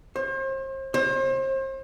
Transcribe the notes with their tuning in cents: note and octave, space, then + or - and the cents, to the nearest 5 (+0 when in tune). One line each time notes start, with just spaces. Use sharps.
C5 +40
C5 +35